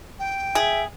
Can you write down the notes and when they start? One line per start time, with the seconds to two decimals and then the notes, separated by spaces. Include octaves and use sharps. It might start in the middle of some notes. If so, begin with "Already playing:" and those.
0.19 G5
0.55 G#4 E5